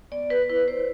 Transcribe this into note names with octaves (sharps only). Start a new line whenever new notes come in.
B3 D5
B4
E4 B4
C5